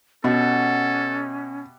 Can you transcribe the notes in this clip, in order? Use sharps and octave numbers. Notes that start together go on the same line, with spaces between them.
B2 C#4 G4 A4 E5 F#5